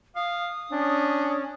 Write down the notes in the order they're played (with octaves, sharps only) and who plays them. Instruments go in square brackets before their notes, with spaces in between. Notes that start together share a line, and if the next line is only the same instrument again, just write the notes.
[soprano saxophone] F5 [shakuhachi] D#6
[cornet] C#4 [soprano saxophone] D4